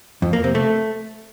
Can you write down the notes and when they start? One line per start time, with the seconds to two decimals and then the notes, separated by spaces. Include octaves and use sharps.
0.22 F2
0.33 A#3
0.44 C3
0.55 A3